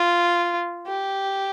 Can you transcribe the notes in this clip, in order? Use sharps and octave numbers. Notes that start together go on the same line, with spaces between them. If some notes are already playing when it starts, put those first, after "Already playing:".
Already playing: F4
G4